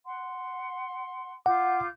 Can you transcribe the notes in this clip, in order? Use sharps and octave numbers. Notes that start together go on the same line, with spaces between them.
F#5 C6
F4 F#5 D6 G6